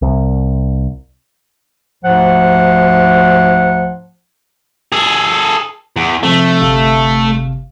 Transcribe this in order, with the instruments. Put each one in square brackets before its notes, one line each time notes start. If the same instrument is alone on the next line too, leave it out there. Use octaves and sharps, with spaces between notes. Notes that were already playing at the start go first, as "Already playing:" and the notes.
[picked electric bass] C2
[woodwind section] D2 G#2 F3 F#5
[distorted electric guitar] G#4 A4
E2
[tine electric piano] C3 F3 C4 [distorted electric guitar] A3
[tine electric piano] G1 C3 F5